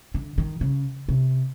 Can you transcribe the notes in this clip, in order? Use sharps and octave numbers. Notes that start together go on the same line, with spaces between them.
D3
D#3
C#3
C3